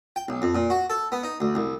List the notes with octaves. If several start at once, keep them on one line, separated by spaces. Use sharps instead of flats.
G5
B1
F2
A#2
F#4
A4
B3
D#4
D2
C2